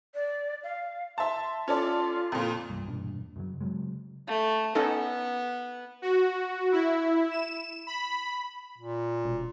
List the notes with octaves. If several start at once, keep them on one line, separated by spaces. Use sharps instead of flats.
D5
F5
E5 A5 C6
C#4 F4 A4 D5
F2 A#2
C2 G2
E1 G2 A#2 D4
F#2 C#3 F#3
C#3 F#3 G#3
A3
B3 C#4 D#4 A4
F#4
E4
E7
B5
A#2
E1